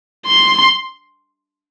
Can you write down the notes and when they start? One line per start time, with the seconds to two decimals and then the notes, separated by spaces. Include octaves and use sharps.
0.27 C6